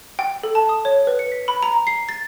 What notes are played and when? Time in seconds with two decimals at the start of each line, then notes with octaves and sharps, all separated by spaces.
0.19 G5
0.43 A4
0.55 A5
0.69 D#6
0.85 C#5
1.07 B4
1.19 C#7
1.32 B6
1.48 B5
1.63 A#5
1.87 C7
2.09 A6